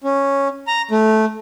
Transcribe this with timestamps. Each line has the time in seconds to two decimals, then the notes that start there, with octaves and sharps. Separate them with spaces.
0.04 C#4
0.67 A#5
0.91 A3